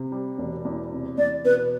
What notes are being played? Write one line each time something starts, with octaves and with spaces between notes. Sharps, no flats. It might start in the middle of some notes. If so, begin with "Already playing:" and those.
Already playing: C3
G3
E1
E2
C3
E2 D5
B2 B4